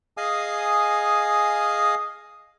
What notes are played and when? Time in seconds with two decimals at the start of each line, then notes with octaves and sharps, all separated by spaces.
0.17 G#4 D#5 F5 G#5 D#6